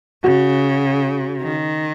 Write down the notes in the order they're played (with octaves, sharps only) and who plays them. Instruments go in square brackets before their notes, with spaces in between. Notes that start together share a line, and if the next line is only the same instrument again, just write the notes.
[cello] C#3 [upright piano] F#4
[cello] D#3